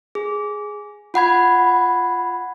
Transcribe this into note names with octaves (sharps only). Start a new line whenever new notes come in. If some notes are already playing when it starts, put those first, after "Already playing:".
G#4
F4 F#5 B5 G#6